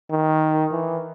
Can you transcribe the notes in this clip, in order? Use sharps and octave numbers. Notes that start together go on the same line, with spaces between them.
D#3
E3